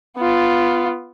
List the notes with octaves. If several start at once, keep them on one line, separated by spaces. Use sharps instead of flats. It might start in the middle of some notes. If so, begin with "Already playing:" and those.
B3 F4